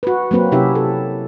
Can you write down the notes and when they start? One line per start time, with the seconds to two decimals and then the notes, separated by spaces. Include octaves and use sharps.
0.03 F#4 B4
0.31 F#3 A#3 C4 B4
0.52 C3 C#4 E4 G4 E5
0.75 A4